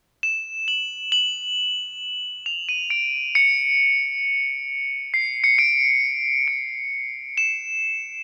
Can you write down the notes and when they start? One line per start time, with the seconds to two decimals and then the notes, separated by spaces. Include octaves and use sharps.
0.23 E7
0.68 F#7
1.12 F#7
2.46 F7
2.69 D#7
2.90 D7
3.35 C#7
5.14 C7
5.44 C#7
5.59 D7
6.48 D7
7.38 E7